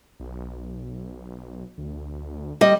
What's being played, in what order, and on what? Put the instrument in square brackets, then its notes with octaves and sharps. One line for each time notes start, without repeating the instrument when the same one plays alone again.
[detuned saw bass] B1
D2
[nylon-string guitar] G3 D#5